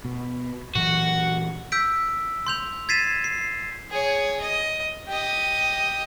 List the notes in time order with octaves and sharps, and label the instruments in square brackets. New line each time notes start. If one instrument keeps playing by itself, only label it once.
[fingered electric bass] B2
[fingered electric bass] A#2 E3 F#3 [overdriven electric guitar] F#4
[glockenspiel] E6 G6 B6 D7
C6 G6 F7
G#6 A6 B6 C7 D#7 E7
C7
[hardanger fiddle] G#4 C#5
D#5
G4 D#5